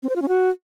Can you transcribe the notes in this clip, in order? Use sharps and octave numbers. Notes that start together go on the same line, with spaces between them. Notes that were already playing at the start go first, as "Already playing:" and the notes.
C4
C5
F4
C#4
F#4